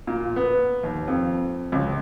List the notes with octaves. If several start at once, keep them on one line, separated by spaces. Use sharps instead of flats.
A#2
B3
D#2
F2
C#2